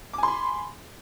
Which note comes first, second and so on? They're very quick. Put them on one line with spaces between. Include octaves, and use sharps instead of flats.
D6 G#5 C6 B5